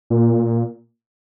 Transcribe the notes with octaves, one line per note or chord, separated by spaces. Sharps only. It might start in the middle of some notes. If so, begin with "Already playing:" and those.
A#2